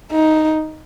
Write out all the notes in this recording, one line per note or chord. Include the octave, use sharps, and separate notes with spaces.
D#4